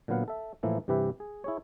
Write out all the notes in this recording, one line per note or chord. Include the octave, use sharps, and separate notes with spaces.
A#2 D3 F#3 B3 F5 F#5
A4 E5
A2 E3 F3 A#3 E4
G2 C3 E3 G4 B4 E5
G#4
E4 G#4 C#5